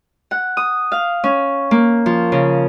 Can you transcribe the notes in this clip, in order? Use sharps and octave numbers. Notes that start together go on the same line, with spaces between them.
F#5
D#6
F5
C#4
A#3
F3
C#3